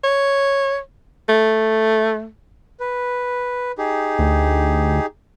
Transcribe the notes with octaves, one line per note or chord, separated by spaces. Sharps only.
C#5
A3
B4
D#4 G4 G#4
D2